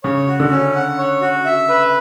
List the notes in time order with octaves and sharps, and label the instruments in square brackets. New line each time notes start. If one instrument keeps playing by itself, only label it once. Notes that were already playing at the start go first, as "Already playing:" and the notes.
[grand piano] C#3 [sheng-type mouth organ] C#5
[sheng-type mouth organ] F#4
[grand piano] D3
[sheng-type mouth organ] C#4
F#5
C#5
F#4
E5
B4